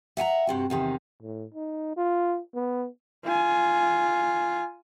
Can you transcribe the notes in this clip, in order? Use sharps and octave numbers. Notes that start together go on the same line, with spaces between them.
E5 F#5 G#5 A#5
G2 C3 F#4
E2 C3 D#3
A2
D#4
F4
B3
F4 G#5